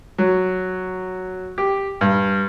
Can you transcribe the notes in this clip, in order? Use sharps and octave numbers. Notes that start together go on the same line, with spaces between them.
F#3
G4
G2